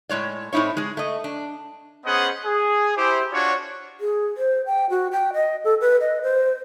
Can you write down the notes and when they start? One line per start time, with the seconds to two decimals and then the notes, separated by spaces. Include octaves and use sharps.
0.09 A2 G#3 C#5 D5
0.53 A2 C4 D#4 E4 C#5
0.77 G#3 G#4
0.97 A3 D#5
1.24 D4
2.06 B3 C#4 G#4 C5 D#5 F#5
2.45 G#4
2.97 E4 G4 C5
3.32 D4 F4 F#4 C#5
4.00 G#4
4.37 C5
4.66 G5
4.90 F#4
5.12 G5
5.34 D#5
5.64 A4
5.81 B4
6.01 D#5
6.22 C5